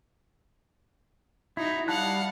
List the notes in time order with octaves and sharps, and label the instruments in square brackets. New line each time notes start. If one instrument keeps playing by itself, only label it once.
[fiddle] D#4 F#4 [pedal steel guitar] E4
[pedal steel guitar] G3 A5 F#6 [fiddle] F5 F#5